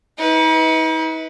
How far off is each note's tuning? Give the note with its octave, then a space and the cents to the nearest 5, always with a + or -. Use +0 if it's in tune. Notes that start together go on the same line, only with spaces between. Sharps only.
D#4 +45 B4 +0